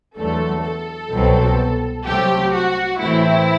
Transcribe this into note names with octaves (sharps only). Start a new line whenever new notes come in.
E2 D3 F#3 A3 A4
A4
C2 B2 F#3 C4
C2 C3 F#3 A3 C4 G4
F#4
A2 E3 A3 C4 E4